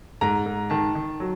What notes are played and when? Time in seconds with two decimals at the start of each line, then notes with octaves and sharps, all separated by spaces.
0.21 G#2 A#5
0.46 G#2
0.70 D#3 A5
0.95 D#3
1.20 F#3